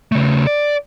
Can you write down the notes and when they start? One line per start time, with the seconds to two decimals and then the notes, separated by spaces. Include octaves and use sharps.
0.12 C#3 A3
0.47 D5